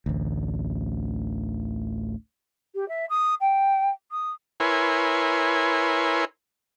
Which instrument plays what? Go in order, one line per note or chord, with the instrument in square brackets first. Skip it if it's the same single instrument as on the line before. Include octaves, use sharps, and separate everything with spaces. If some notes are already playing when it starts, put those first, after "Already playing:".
[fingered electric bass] A1 D2
[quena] G4
E5
D#6
G5
D#6
[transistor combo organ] E4 A#4 B4 C#5 G#5 C6